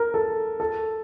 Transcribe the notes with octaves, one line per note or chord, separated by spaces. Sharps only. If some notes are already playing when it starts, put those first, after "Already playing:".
Already playing: A#4
A4
A4